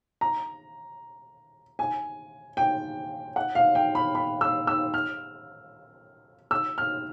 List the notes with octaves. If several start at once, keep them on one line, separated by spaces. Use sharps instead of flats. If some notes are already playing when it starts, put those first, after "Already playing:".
A#5
G#5
G5
F#5
F5
G5
B5
B5
E6
E6
F6
E6
F6